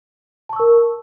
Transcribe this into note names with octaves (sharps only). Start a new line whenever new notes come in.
A#4 A5 C#6 E6